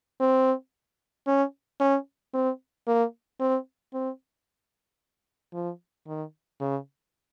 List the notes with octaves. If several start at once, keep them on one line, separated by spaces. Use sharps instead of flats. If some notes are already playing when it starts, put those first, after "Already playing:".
C4
C#4
C#4
C4
A#3
C4
C4
F3
D#3
C#3